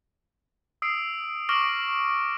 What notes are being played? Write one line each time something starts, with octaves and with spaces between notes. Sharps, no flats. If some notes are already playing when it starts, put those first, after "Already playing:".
D#6 E6 C7 D7
C#6 D6 F6 A#6 D7 F#7